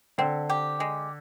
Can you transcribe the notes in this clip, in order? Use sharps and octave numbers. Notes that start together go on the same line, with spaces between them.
D3 C4
G4
G#3